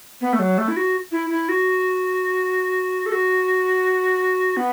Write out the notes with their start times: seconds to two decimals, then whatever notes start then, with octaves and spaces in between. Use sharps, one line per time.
0.21 B3
0.33 A3
0.39 F#3
0.58 A3
0.68 E4
0.77 F#4
1.12 E4
1.30 E4
1.49 F#4
3.06 A4
3.12 F#4
4.57 B3